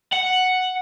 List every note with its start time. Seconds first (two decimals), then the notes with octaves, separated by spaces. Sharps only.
0.12 F#5